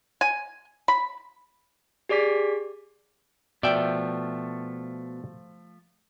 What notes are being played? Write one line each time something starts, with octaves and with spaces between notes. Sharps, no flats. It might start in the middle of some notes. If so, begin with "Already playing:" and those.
G#5
B5
G4 G#4 D5 D6 B6
B2 F3 A3 D5 E5 G5